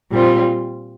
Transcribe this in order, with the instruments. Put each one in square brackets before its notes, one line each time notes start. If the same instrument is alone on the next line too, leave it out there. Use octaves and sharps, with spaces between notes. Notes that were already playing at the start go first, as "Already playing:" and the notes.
[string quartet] A#2 G3 C4 F4